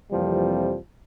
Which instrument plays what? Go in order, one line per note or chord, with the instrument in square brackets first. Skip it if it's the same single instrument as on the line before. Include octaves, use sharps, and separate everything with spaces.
[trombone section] F2 C3 E3 F3 G3 A#3